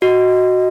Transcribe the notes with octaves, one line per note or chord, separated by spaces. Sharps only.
F#4 D#5